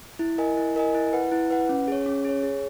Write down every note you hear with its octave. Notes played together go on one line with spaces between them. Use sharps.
E4
A#4 D#5 G#5
E4
A#4 D#5 G#5
E4
B4 F#5
E4
B4 F#5
C#4
G#4 C#5
C#4
G#4 C#5
G#4